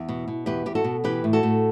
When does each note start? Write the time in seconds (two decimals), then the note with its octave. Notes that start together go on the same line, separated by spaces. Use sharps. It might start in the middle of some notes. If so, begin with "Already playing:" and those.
Already playing: E2
0.09 B2
0.28 B2
0.46 E2 G4 B4
0.66 E2 G4
0.75 F#4 A4
0.84 B2
1.04 E3 G4 B4
1.24 A2
1.33 F#4 A4
1.43 A2